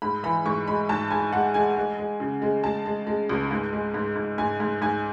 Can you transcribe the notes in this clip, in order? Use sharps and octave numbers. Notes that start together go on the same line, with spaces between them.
G#2 B5
E3 B5
G#2 C#6
G#3 B5
G#2 A5
G#2 G#5
G#3 F#5
G#3 G#5
G#3
G#3
C#3
G#3
G#3 A5
G#3
G#3
C#2
G#2
G#3
G#2
G#2
G#2 G#5
G#2
G#2 G#5